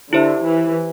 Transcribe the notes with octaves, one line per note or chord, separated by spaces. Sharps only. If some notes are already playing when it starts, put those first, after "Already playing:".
D3 E4 G4 C5 E5
E3